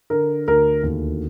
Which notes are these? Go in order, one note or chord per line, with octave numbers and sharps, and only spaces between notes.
D3 A#4
D2 A#4
D#2